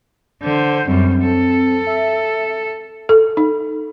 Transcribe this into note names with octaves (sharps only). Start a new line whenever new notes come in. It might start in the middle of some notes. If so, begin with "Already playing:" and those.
D3 C5 G6
F#2 G3 C4
A4
E5
A4
D#4